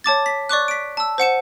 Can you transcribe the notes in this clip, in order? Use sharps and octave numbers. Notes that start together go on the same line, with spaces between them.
C#5 A5 D6 A6
B6
D5 C#6 D6 F#6
B6 D7
A5 E6
C5 F#5 C#7 E7